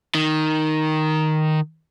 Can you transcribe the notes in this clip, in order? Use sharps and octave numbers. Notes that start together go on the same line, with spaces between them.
D#3